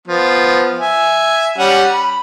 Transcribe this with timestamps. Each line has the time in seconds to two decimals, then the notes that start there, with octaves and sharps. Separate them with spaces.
0.08 F3 B3
0.79 E5 G#5
1.58 G3 C#4 F#5
1.91 B5